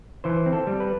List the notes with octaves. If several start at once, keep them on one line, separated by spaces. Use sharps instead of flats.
E3 C5
C4
A4
G3
B4